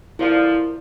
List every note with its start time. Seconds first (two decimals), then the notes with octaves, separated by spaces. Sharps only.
0.19 D3 F3 E4 A#4 D5 F5